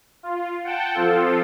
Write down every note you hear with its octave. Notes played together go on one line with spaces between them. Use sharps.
F4
F#5 G5 A5
F3 C4 F4 A4